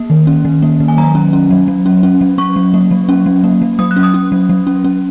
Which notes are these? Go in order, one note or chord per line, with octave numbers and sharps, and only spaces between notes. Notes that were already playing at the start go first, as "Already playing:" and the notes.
Already playing: A#3
D#3
C#4
D#3
A#3
D#3
G#5
F#3 A#5
C#4
C#4
F#3
F#3
C#4
C#4
F#3
C#4 C#6
F#3
A#3
F#3
C#4
F#3
A#3
F#3
F#3 D#6
F#6
C#4
D#6
C#4
F#3
F#3
C#4
C#4